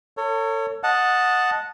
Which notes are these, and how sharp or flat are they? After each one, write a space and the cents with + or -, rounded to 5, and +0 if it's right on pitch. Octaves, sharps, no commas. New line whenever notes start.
A4 +40 C#5 +0
D#5 +0 F#5 -10 A5 +0